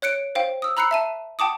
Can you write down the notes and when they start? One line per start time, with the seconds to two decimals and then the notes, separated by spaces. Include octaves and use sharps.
0.02 C#5 F#6 C#7 D7
0.35 C5 F5 G5
0.62 D#6 E6
0.77 A#5 B5 E6 F#6 C7 C#7
0.91 E5 A5 D#7
1.39 F#5 G5 A5 D6 D#6